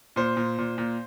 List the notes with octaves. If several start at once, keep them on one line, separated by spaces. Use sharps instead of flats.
A#2 C5
A#2
A#2
A#2